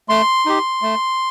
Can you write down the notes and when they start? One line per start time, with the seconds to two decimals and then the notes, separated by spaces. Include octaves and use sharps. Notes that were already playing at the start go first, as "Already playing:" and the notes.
0.09 A3 C6
0.46 D#4 G4
0.82 A3